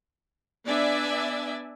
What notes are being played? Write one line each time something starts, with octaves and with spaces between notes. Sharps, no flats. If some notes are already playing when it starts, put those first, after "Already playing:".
B3 D4 D5 E5 G#5